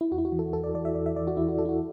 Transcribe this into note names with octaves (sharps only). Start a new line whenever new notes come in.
E4
E2 F#4
E4
F#4
E3
A4
E2 A4
D5
E3 D5
E5
E2 D5
E5
E3 D5
F#4
E2 E4
F#4
E3 A4
E4
F#4